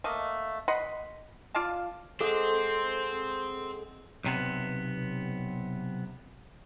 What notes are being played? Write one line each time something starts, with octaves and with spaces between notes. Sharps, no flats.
A3 A#3 D#5
D#5 F#5 B5 C6
F4 D5 F5 A5
G#3 C4 A4 C5 D#5 F#5
B1 C3 B3